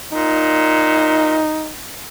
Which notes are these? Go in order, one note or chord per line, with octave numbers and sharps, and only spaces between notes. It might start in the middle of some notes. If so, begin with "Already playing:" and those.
A#2 D#4